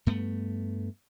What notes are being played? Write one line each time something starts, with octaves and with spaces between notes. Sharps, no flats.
G2 A3 B3